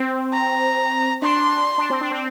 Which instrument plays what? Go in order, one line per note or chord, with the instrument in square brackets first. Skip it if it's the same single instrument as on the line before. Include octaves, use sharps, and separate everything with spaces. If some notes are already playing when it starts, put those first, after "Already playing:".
Already playing: [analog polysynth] C4
[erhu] A#5
[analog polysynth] D4 [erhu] C6
[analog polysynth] D4
C4
D4
C4